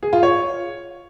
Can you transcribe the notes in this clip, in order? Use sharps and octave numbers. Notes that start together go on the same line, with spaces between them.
G#4
F4
C#5